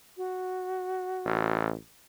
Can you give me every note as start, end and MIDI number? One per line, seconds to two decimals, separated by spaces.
0.17 1.58 66
1.25 1.74 33